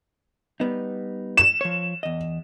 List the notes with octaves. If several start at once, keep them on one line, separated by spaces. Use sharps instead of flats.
G3 B3 D#4
E7
F3 C#5
E2 D#5